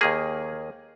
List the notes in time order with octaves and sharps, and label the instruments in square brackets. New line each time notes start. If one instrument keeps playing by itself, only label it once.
[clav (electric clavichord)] D#2 D#3 A#3 G#4